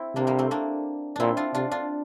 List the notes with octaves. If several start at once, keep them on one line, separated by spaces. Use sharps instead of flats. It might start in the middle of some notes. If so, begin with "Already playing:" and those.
Already playing: C4 E4
C3 A#3 D4
G3 A#3
A3 C4
A#3 D4
A#2 C4 D4 E4
D4 F4
C3 D4 F4
D4 F4